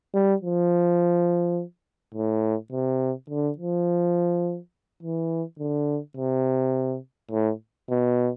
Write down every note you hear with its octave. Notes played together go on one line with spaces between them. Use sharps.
G3
F3
A2
C3
D3
F3
E3
D3
C3
A2
B2